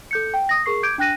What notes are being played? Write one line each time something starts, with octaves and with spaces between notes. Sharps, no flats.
A4 G6 C#7
G5
D#6 A#6
G#4 A#4 C#6 C7
D6 G6 G#6 D7
D4 G5 F#6 A#6 D#7